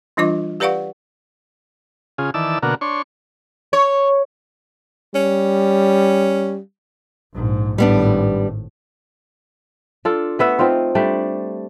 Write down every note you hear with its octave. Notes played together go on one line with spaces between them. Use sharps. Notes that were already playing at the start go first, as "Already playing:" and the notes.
E3 G3 D4 F4 D#5 D6
G4 B4 D5 F5 F#5 C#6
C#3 F4 G#4
D#3 E3 D5 A5 E6
B2 D3 A#3 F#4 A#4
D4 C#5 C6 C#6
C#5
G3 C#4
A#1 G#2
G#1 A2 G3 B3 D4
D4 F4 A4
A3 B3 E5 F#5
C4 D#4 F4 C5
G3 A3 D4